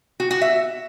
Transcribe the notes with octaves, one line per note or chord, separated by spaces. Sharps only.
F#4
F#4
E5